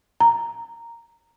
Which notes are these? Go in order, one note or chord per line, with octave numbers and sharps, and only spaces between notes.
A#5